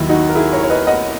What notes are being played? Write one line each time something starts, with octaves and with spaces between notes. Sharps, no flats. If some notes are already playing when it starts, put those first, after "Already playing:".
Already playing: D#2 D#3 F#3 E4
D#4 F#4
A#4
E4 G#4
A#4 C#5
C#5
B4 D#5
D#5 F#5